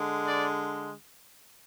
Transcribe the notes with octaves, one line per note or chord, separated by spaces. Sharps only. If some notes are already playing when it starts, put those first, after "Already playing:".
Already playing: D3 G#3
D5